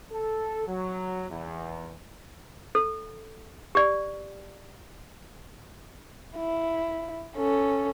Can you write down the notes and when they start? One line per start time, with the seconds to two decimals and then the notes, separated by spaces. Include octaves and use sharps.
0.12 A4
0.67 F#3
1.30 E2
2.75 A4
3.75 G4 D5
6.36 E4
7.37 C#4 A4